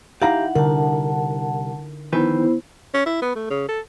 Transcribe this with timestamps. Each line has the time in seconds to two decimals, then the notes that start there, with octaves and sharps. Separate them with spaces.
0.22 D#4 E4 G4 F5 F#5 A#5
0.55 C2 D3 A#4 F#5 A5
2.13 D#3 F3 B3 E4 B4 C5
2.94 C#4
3.06 E4
3.22 B3
3.35 A3
3.50 C#3
3.68 A4